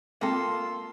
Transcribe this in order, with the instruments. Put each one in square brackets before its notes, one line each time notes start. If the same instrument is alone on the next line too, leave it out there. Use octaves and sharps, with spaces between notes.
[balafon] G#3 C4 G5 [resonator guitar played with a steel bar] A#3 A4 [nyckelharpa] F4 C6